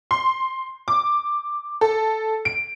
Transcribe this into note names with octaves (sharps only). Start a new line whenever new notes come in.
C6
D6
A4
D7